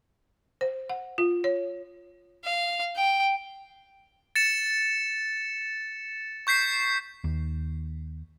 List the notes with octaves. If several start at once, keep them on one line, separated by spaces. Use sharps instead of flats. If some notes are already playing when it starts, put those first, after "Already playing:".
C5
F#5
F4
C#5
F5
G5
A6 C#7 E7
C#6 G6 B6 C7
D#2